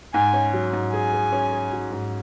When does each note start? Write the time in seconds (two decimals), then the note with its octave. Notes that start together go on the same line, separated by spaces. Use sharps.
0.14 G#2 G#5
0.33 C#4
0.53 F#3
0.73 G#2
0.93 G#4 G#5
1.13 G#4
1.32 C#4
1.52 G#4
1.72 F#3
1.92 G#2